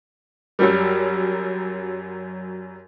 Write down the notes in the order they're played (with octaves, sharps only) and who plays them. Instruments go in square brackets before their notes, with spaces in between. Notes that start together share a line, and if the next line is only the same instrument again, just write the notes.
[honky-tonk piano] F#2 F#3 G3